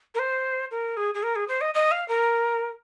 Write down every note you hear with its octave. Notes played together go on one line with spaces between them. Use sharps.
A#4
C5
A#4
G#4
G#4
A#4
G#4
C5
D#5
D#5
F5
A#4